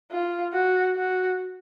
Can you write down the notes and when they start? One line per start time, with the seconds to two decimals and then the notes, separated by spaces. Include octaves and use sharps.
0.11 F4
0.53 F#4
0.96 F#4